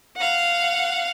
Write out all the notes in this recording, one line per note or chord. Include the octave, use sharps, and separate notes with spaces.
F5 F#5